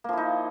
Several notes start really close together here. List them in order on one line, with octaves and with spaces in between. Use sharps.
A#3 F3 E4 D#4